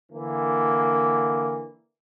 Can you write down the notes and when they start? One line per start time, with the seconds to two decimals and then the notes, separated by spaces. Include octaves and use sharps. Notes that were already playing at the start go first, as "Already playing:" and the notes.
0.12 D3 E3 A#3